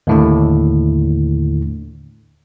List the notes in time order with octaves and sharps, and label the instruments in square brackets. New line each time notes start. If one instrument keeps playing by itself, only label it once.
[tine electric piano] D#2 A2 D3